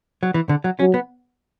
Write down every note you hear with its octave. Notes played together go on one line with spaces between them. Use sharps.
F#3
E3
D3
F#3
F#3 C#4
B3